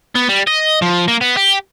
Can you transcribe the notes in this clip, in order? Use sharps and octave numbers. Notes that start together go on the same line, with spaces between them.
B3
G3
D#5
F3
A#3
B3
G4